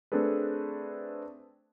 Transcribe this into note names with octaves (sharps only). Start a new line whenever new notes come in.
A3 C4 D4 G#4 A4 B4